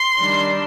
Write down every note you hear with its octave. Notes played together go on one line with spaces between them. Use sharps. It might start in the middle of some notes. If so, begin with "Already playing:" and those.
Already playing: C6
D#3 G3 D4